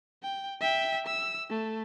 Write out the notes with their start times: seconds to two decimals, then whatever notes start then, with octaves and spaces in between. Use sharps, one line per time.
0.23 G5
0.61 E5 G5
1.06 E6
1.50 A3